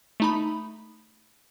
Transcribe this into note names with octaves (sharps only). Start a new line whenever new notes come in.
A3 D#4 B5